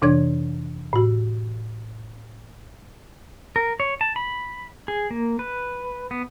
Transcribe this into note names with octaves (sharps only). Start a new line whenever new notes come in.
F2 C3 E3 D4 C#5 G#6
A2 F#4
A#4
C#5
A5
B5
G#4
A#3
B4
B3